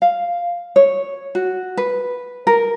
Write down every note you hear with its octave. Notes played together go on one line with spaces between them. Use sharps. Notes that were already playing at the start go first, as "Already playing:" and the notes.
F5
C#5
F#4
B4
A#4